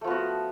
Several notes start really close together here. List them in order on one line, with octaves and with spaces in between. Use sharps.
A3 F3 B3 F#4